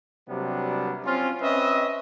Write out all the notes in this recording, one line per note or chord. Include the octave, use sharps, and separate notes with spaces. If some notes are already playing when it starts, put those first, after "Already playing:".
C3 F#3 G3 A#3 B3 D4
C4 C#4 F4
C4 C#4 B4 D#5 E5